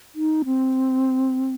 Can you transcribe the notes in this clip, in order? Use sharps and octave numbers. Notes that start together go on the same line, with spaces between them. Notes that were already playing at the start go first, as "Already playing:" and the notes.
D#4
C4